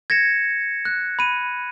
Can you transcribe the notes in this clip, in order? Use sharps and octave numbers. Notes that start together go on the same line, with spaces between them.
G#6 A#6 C#7 E7
F#6
B5 D#7